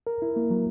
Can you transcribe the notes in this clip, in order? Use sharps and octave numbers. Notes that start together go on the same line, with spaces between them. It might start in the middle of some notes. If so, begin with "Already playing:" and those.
A#4
E4
A#3
F#3